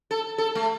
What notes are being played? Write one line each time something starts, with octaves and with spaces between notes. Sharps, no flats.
A4
A4
A3